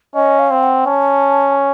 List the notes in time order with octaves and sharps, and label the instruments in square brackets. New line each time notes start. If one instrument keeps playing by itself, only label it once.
[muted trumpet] C#4 [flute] D#5
[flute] F5
[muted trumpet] C4
[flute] F#5
[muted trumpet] C#4 [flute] A5